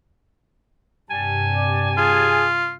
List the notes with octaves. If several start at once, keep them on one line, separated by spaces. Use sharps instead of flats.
G2 C3 G3 G#5 A5
D5
F4 G#4